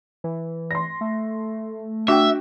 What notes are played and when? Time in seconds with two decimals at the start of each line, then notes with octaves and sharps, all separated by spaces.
0.24 E3
0.71 C6 A#6
1.01 A3
2.08 D4 F#4 E5 G5